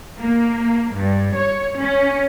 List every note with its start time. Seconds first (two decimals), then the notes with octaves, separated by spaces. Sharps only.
0.21 A#3
0.96 G2
1.37 C#5
1.80 C#4